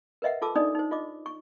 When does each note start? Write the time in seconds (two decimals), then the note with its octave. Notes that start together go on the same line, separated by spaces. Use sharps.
0.22 A#4 B4 D#5 E5 F#5
0.42 F4 A4 A5 D6 E6
0.56 D4 D#4 D5 D#5 D#6
0.75 D#4 C5
0.91 F4 D#5 D6
1.26 C#6